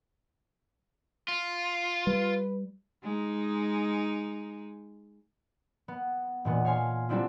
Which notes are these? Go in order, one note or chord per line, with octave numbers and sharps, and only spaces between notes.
F4
G3 B4
G#3 D#4
B3
E1 A#2 B3
C#5 F5 G#5 C6
G3 B3 C4 D4 E4 F4